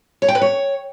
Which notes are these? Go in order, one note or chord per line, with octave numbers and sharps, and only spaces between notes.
C#5
G5
B4
C#5